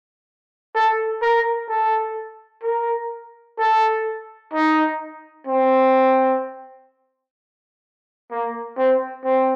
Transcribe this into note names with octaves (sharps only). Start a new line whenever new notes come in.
A4
A#4
A4
A#4
A4
D#4
C4
A#3
C4
C4